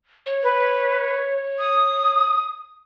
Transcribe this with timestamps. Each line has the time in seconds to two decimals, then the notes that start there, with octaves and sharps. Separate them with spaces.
0.26 C#5
0.43 B4
1.59 D#6